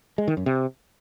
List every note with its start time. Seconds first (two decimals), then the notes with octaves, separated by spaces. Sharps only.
0.18 G#3
0.28 D#3
0.37 F#2
0.46 C3